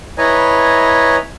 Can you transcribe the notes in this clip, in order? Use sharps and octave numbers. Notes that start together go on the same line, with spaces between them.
E4 B4 C#5 D#5 G#5 A#5